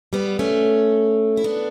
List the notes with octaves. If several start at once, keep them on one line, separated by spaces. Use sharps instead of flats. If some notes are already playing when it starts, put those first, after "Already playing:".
G3 B3
A3 C#4
E4
B3 D4